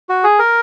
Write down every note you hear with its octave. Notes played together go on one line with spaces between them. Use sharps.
F#4
G#4
A#4